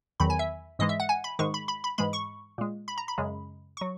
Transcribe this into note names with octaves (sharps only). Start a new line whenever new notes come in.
E2 D#3 F#3 B5
G#5
E5
G#2 E3 G#3 D#5
E5
F#5
G#5
B5
G#2 D#3 G#3 C#6
B5
B5
B5
G#2 E3 G#3 B5
C#6
A#2 G#3
B5
A#5
B5
F#2 C#3 G#3
F#3 C#6